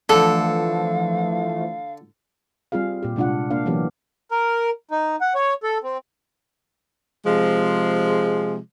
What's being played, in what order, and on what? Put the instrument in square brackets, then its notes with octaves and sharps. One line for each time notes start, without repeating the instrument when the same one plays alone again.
[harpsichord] D3 [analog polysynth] E3 F3 A3 [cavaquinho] A4 [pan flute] F5
[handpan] G3 C4 F4 G#4 F5
A#2 G4
C3 G#3 D4 F4 F#5
A#3 D4 F5
E3 F#3 A#3 B3 G4
[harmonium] A#4
D#4
F#5
C#5
A4
C4
[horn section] C3 F3 G#3